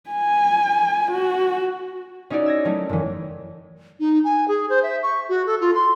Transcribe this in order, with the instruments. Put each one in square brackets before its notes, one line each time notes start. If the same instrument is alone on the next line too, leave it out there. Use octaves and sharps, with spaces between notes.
[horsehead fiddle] G#5
F#4
[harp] C#4 D#4 E4 F#4 D5
E6 G#6 A#6
F#3 G3 A3 C#4 D#4
F#1 E3
[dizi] D#4
G#5
G#4
C5
E5
C#6
F#4
A4
F4
C6